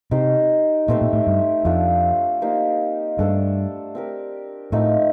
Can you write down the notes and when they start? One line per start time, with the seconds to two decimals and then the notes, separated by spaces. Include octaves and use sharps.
0.11 C3 D#4 G4 C5
0.88 A#2 A3 C4 G4 C5
1.01 A#2
1.13 A2
1.27 G2
1.65 F2 F3 A3 D4
2.42 A#3 D#4 G4 C5
3.18 G2 A3 D4 A4 C5
3.95 C4 G4 A#4
4.72 A2 F3 A3 C4 D#4